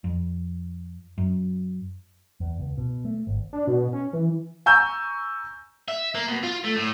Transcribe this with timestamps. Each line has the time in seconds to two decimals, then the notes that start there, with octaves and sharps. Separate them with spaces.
0.04 F2
1.18 F#2
2.40 E2
2.60 C#2
2.78 B2
3.05 A3
3.27 G#1
3.53 D4
3.67 B2
3.93 C#4
4.13 E3
4.66 G#5 A#5 C#6 E6 G6
5.88 E5
6.15 A#3
6.28 B2
6.43 F4
6.64 A3
6.76 A2